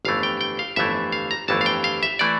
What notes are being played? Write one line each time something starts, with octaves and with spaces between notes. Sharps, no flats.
G1 F2 E3 A3 F5
G5
G5
F5
G1 F2 E3 A3 E5
F5
A#5
G1 F2 E3 A3 A5
F5
G5
F5
E5
E3 A3 D5